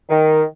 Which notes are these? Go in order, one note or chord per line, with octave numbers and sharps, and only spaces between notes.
D#3